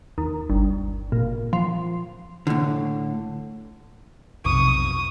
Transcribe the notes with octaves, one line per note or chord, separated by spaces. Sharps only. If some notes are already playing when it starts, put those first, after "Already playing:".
D#2
G1
A#2
F3
A2 D3
B1 F2 C3 C#6 D#6